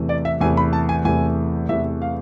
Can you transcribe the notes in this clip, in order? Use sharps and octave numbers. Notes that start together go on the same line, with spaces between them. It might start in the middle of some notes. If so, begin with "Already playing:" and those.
Already playing: E2 C3 E3 A3
D5
E5
E2 C3 E3 A3 G#5
B5
A5
G#5
E2 C3 E3 A3 G#5
E2 C3 E3 A3 E5
F5